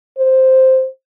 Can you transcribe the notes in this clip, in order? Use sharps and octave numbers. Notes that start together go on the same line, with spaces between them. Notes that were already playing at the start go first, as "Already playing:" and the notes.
C5